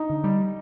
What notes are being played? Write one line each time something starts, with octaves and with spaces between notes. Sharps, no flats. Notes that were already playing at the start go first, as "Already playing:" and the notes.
Already playing: D#4
D3
G3